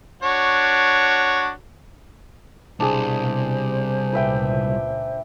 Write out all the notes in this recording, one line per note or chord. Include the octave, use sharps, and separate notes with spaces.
D4 F#4 C#5
C2 B2 D4 G#4 C5
C#2 A#2 B4 E5 G5